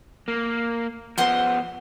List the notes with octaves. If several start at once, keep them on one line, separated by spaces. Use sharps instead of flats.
A#3
F3 B3 C5 F#5 C6